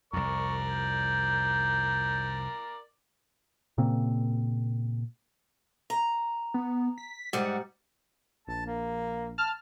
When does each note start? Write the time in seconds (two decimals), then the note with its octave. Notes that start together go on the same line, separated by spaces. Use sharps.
0.13 C2 F2 A#4 D5 C#6
0.69 G6
3.78 A#2 C#3 A#3 C4
5.90 A#5
6.54 B3
6.98 B6
7.33 G#2 G3 F#5
8.47 A#1 A5
8.66 A#3
9.38 A5 F6